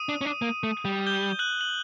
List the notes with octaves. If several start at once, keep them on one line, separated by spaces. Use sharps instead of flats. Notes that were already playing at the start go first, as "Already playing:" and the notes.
Already playing: D#6 D#7
D4
C#4
D4
A#3
A3
G3
G6 G7
F#6 F#7
F#7